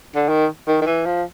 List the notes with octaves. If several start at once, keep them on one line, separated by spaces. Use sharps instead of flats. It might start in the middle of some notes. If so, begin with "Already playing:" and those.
D3
D#3
D#3
D#3
E3
F3